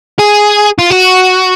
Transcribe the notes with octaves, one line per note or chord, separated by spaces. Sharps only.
G#4
F4
F#4